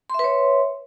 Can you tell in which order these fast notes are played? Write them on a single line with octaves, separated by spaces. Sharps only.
C6 E5 B4 C#5